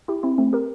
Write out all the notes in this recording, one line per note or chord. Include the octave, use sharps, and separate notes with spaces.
E4 G4
C4 E4
A3 C4
G4 A#4